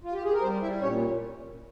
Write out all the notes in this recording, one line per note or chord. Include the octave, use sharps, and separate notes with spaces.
F4
G4
G#4
A#4
G3 C4 C5
G3 E4 E5
A#2 C#4 C#5